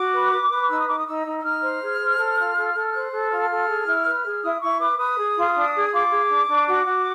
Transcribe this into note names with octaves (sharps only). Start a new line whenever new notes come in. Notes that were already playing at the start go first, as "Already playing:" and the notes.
Already playing: F#4 D6
B4
B4
B4
D#4 E6
D#6
D#4 D6
D#6
D#4 E6
D#4
E6
D#4 F6
C5
G#4
C5
A4
F4
A4
A4
C5 F#6
A4
F4 F6
A4
G#4
E4
B4
G#4
E4 D#6
E4 C#6
B4 D6
B4 D#6
G#4
F4
D4
G#4
F4 D6
G#4
D4
D4
F#4 D6
F#4